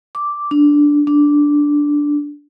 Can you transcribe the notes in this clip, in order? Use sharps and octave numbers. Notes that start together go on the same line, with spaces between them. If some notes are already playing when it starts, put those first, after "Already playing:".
D6
D4
D4